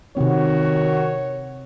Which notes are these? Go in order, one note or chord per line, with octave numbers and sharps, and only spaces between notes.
C3 D#3 C4 F#4 C#5